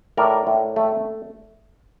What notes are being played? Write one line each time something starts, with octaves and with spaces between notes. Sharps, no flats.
A2 A#4 D5
A2
A3